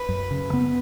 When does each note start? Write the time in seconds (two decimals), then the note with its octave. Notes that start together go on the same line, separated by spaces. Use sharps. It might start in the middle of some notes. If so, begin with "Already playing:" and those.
Already playing: B4
0.09 F#2
0.31 C#3
0.53 B3